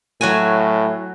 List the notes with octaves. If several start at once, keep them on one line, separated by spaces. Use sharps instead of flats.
A2 F#3 F#4 G#5